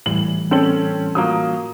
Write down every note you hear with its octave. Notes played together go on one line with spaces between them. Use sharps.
A2 E3 G3 F#7
C4 C#4 A4 C#5 F#7
F3 F#3 A#3 D#6